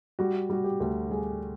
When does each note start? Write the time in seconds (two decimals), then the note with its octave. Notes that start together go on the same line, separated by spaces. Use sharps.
0.19 G3 F#4
0.50 G3 F#4
0.64 G4
0.80 D2
1.10 G3 G#4